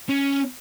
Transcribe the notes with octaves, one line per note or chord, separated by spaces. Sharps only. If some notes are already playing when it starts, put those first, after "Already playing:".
C#4